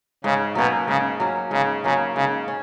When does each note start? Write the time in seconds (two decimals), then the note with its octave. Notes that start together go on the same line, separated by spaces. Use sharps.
0.24 G#2 C#3
0.55 B2 F#3 A#3 C#4
0.87 G#2 C#3
1.20 F#3 A#3 C#4
1.51 G#2 C#3
1.84 C#3 F#3 A#3 C#4
2.15 G#2 C#3
2.48 C#4